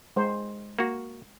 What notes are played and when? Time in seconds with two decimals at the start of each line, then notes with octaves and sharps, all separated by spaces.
0.16 G#3 C5
0.79 A#3 F#4